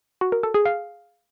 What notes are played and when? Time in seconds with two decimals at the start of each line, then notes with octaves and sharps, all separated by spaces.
0.21 F#4
0.32 A#4
0.43 A4
0.54 G#4
0.66 F5